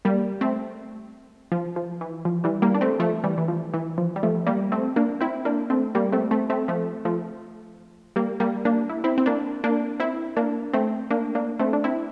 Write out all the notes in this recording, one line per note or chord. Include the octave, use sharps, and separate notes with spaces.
G3 A#3
A3 C4
F3
F3
E3
F3
E3 G3
G3 A#3
D4
A3 C4
F3 A3
E3 G3
E3
F3
E3
F3
G3
F3 A3
G3 A#3
A3 C4
A#3 D4
C4 E4
A#3 D4
A3 C4
G3 A#3
A3 C4
A3 C4
A3 C4
F3 A3
F3 A3
G3 A#3
G3 A#3
A#3 D4
E4
C4 E4
C4
A#3 D4
A#3 D4
C4 E4
A#3 D4
A3 C4
A#3 D4
A#3 D4
A3 C4
D4
C4 E4